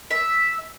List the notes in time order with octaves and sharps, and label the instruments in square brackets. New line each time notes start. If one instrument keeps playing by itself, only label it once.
[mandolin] E5